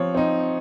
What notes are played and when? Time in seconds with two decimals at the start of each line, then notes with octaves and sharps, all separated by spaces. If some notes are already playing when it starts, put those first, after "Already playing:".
Already playing: F3 C4 C#5
0.15 C4 D#4